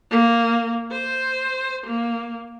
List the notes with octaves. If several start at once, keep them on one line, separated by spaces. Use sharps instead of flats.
A#3
C5
A#3